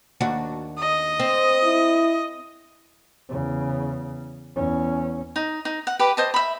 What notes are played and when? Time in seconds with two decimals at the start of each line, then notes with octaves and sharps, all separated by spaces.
0.21 D#2 D4 F#4
0.79 D#5
1.20 C4
1.64 E4
3.29 E2 C#3
4.56 E2 C#4
5.36 D#4
5.65 D#4
5.87 F#5
5.99 G4 B4 D6
6.17 C5 D#5 A5
6.34 E5 B5